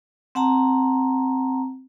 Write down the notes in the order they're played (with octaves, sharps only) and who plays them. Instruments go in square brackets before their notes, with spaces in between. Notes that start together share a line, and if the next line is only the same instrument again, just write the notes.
[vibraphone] C4 F#5 A5 A#5